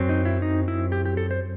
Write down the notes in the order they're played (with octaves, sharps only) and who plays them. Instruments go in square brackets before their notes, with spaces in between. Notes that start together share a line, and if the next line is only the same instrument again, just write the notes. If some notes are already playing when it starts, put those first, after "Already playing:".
Already playing: [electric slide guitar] F#2 F#3 C4
D#4
E4
D#4
E4
G4
G4
A4
C5